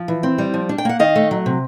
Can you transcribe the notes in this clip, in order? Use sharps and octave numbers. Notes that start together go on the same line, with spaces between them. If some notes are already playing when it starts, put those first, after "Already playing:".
Already playing: F3
E3
C4
G3
F3
D4
G5
A#3 F#5
D#3 D#5 F5
A3
F#3
C3